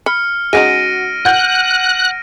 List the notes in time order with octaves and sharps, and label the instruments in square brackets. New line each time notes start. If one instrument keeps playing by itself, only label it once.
[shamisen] B5 [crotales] F6 C#7
[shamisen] G#3 C#4 D#4 [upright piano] F#4 [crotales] A#6 D7 D#7
[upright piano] F#5 G6 [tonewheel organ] F#6